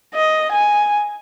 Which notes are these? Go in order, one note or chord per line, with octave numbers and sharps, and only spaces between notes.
D#5
G#5